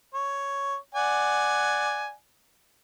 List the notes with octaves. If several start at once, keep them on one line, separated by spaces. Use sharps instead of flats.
C#5
D5 F#5 G#5